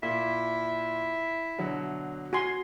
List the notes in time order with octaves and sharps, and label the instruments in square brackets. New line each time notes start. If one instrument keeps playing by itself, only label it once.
[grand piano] A#2 [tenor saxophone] E4
[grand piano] B2 D3 F#3
[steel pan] F#4 G#5 C6